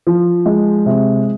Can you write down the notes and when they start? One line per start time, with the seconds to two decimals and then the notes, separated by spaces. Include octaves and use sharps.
0.07 F3
0.46 G#3
0.86 C3